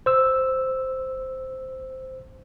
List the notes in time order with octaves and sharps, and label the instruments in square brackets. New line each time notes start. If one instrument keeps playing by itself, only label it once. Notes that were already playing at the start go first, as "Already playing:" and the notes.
[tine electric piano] C5 E6